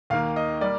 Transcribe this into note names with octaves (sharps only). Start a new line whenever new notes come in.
D#2 D#3 A#3 F5
D#5
G3 A#3 D5